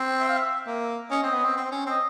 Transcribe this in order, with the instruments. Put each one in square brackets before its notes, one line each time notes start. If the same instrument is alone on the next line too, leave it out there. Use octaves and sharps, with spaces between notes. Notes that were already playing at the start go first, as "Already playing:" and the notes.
Already playing: [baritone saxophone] C4
[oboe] E5
F5
E5
[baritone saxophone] A#3
[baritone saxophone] C#4 [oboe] D#5
[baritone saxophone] C4
B3
C4
C4
C#4
[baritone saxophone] C4 [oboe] D#5